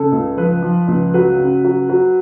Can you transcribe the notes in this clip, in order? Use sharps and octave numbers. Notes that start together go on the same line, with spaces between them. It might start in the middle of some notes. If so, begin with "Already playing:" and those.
Already playing: C#3 A4
C#2
F3 B4
F3
C#2
F#3 B4
C#3
F#3
F#3